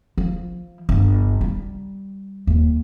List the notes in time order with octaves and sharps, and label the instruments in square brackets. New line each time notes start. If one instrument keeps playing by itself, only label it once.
[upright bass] F3
G1
G3
D#2